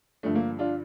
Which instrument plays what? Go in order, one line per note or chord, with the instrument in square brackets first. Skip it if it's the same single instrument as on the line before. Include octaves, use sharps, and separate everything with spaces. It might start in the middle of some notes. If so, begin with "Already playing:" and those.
[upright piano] G2 D3 F3 A3
A#3
D4 F4